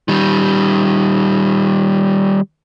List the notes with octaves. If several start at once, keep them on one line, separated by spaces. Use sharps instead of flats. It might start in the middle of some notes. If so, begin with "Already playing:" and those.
D#3 G3